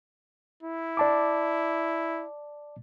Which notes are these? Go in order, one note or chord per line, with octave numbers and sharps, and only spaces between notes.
E4
D5 A5 D6